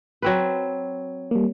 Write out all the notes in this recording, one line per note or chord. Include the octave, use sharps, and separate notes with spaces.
F#3 C4 B4
G3 A#3